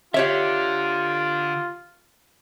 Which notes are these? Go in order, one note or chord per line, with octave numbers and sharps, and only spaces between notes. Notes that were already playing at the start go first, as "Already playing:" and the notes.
D3 F4 G4 C#5 E5